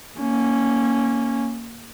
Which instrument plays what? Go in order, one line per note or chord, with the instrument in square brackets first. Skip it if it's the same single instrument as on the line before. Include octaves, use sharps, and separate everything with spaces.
[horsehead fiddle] A#3 C#4